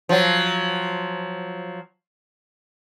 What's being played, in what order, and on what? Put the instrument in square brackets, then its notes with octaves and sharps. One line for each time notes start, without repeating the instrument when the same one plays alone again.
[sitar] F3 F#3